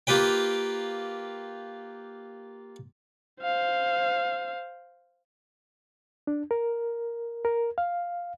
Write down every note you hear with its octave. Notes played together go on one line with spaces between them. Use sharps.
A#3 F4 G4 B4 G5
C5 F5
D4
A#4
A#4
F5